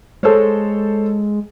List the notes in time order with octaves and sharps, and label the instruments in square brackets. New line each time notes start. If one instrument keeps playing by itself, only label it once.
[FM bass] G#3 [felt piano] A4 C5 C#5